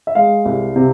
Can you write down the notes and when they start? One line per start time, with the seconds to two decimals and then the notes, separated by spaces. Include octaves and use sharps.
0.07 E5
0.15 G#3 F5
0.45 C2
0.76 C3